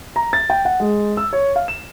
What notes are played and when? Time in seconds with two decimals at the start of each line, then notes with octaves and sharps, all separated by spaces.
0.16 A#5
0.33 A6
0.50 G5
0.65 F#5
0.80 G#3
1.17 E6
1.33 C#5
1.56 F5
1.68 E7